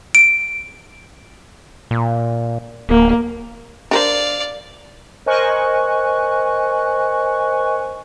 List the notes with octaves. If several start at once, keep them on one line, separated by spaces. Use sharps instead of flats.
D7
A#2
D1 A#3
D4 A#4 C5 D5 F5
A#4 C5 D#5 G#5 C#6 F#6